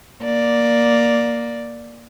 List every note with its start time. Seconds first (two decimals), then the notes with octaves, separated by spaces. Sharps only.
0.23 A#3 D5